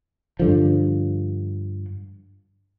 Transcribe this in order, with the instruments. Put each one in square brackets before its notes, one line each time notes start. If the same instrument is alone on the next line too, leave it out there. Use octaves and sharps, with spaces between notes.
[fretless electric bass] G2 D3 F3